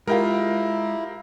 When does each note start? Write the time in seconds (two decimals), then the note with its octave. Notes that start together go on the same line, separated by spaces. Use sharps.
0.07 G#3 E4 F4 G4 A#4